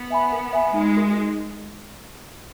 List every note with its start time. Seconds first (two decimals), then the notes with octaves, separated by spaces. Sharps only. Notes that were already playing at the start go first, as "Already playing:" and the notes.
Already playing: B3
0.10 E5 G#5 B5
0.32 A#4
0.53 E5 G#5 B5
0.74 G#3 D#4
0.95 F#4 A#4
1.18 D#4